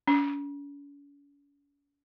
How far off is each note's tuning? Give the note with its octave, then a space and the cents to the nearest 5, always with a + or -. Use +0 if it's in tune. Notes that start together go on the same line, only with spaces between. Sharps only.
C#4 +45